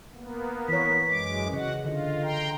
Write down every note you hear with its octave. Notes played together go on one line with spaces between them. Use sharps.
A#3 B3
E3 C#5 B6
F#2 G#3 D6
C#3 F#4 D#5 F#5
D3 F4 D#5
G5 A#5 C6